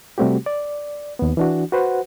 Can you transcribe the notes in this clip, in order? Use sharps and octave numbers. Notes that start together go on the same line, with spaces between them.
C3 G3 A3 C4 F#4 G4
D5
D#2 B3
E3 D4 F#4
F#4 B4 C5 F#5